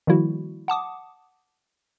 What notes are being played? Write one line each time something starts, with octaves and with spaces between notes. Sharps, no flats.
D#3 F3 G3 A#3 E4 F#4
F#5 A5 D6 D#6